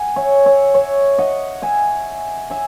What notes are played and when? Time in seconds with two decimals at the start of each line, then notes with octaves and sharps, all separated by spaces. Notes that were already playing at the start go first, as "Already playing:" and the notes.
Already playing: F#5 G#5
0.16 C#5 E5
0.46 C#5 E5
0.74 C#5 E5
1.18 D#5 F#5
1.62 E5 G#5
2.50 E5 G#5